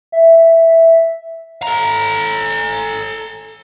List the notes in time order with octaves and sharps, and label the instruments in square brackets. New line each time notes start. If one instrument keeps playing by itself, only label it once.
[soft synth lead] E5
[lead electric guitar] A4 A#5